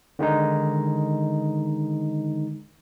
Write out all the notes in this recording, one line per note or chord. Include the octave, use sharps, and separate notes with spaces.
D3 D#3 G#3 D#4